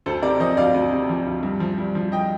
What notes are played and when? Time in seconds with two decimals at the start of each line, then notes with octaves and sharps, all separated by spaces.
0.06 D2 A4 C5
0.23 C3 A#4 D5
0.40 F3 C5 D#5
0.57 D2 D5 F5
0.74 D2
0.92 C3
1.09 F3
1.26 D2
1.43 G2
1.60 F3
1.78 G2
1.95 F3
2.12 D#5 G5